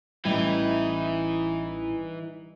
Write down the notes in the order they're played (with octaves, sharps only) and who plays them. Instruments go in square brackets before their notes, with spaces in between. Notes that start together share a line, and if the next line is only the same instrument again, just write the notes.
[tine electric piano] A1 E4 G#6 [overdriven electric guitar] E3 [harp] G3 [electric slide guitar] D#4 D#5